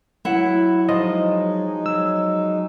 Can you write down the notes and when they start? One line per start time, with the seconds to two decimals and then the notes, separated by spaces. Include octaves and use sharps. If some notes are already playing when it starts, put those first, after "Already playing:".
0.25 F#3 E4 F#5
0.89 F3 G#3 D#4 D#5
1.86 F#3 E6